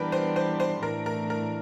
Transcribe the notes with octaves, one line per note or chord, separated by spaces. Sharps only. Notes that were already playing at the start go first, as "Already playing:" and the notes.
Already playing: E3 G3 B3 D4 G4 A#4 B4
C5
C5
C5
A2 E3 A3 D4 A#4
A#4
A#4